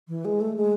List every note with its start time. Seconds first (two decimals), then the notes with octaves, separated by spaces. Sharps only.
0.08 E3
0.25 G#3
0.41 A3
0.57 G#3